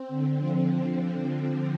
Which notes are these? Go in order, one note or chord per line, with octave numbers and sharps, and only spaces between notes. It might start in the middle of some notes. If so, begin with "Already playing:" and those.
Already playing: C4
D3
F3